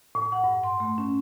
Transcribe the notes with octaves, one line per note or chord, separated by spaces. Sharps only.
A2
F#5
G2
C6
A3
C#4